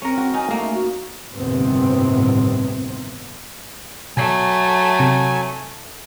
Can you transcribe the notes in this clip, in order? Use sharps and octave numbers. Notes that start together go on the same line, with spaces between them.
C4 C#4 A#4
F#4
D#4 D#5 G#5
A3 A#3 D#4
F#4
G1 D#2 A2 C3 B3 C4
B2 F#3 A3 G#5
C3